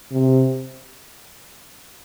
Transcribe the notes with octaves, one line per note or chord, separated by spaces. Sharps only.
C3